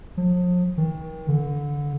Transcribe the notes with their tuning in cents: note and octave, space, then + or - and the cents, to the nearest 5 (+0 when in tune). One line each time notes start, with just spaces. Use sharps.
F3 +40
D#3 +35
D3 -20